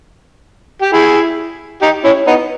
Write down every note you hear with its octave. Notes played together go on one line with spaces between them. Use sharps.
G4
E4 G#4
D#4 G4
C#4 E4
B3 D#4